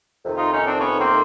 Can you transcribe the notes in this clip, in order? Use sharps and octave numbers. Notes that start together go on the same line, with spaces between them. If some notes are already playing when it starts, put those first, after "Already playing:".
F2 C3 D#3
D#4 F4
C#4 D#4
C4 D4
B3 C#4
A#3 C4